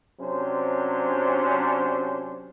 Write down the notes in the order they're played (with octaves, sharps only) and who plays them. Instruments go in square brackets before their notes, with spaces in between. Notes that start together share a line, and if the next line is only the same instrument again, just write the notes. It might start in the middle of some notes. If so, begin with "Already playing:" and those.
[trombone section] C3 F#3 C#4 D4 C5